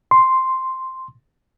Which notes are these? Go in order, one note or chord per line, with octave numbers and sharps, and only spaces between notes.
C6